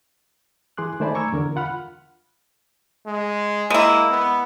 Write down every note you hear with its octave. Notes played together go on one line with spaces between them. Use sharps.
E3 G#4 C6 D6 F#6
D#3 A3 C5 D5 G#5 B5
A#5 C#6 D6 E6 G#6
E2 D3 A#4
F4 F#5 B5 F6
G#3
G#3 A#3 E4
B3